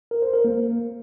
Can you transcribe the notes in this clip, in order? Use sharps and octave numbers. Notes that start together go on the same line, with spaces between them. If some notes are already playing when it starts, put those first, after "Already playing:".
A#4
C5
A#4
A#3